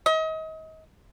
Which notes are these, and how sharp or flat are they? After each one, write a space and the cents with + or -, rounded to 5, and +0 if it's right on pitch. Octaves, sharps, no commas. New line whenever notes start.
D#5 +35